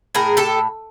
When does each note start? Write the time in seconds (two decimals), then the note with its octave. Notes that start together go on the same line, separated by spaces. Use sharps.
0.15 A2 G#4 A#4
0.37 G4 A4